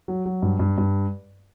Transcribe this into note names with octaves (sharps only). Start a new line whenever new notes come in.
F#3
F#3
G2
G2
G2